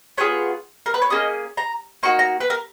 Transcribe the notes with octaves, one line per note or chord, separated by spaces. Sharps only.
B3 F4 G#4 C#5
A#4
B4
C#5
A#3 C#4 G#4 D#5
A#5
A#3 D#4 F#4 C#6
A#5
B4
A#4